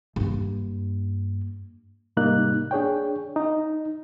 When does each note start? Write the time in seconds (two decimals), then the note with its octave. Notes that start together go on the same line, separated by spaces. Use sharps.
0.16 G2 A#3
2.17 G#2 C3 G3 A#3 D#4 F#6
2.71 D4 G#4 C#5 G5
3.36 D#4